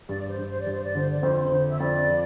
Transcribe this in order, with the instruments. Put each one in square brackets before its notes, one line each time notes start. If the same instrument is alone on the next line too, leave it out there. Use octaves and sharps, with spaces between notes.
[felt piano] G2 [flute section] D5
[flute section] C5
[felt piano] G2
[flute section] C5
D5
[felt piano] G2
[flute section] C5
D5
[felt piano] D3 [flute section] C5
[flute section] D5
[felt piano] F2 [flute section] C5
[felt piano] D3
[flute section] E5
[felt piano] F2 [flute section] D5
[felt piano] F3